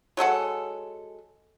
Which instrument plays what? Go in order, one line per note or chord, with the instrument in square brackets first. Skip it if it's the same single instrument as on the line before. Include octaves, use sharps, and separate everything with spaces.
[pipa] F#3 G#3 A4 F#5